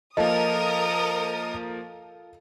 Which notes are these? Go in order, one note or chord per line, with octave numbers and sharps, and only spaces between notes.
F3 A#3 F4 A4 A#4 D#5 D#6